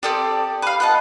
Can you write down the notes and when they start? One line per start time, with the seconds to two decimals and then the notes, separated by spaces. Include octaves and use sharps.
0.03 C4 G4 A4 D5 D#6
0.62 B4 F5
0.80 F4 B4 D#5 F#5 A5